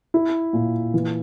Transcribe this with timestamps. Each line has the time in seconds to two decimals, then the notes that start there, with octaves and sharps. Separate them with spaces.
0.14 E4
0.53 A#2
0.94 E3